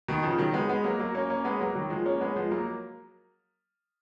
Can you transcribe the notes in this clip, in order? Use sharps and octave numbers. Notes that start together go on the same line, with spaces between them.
B2 D#3
C#3 F3
D#3 F#3
G#3 B3
G#3 B3
F#3 A#3
F#3 A#3
A#3 C#4
A#3 C#4
G#3 B3
F#3 A#3
D#3 F#3
F3 G#3
A#3 C#4
G#3 B3
F3 G#3
F#3 A#3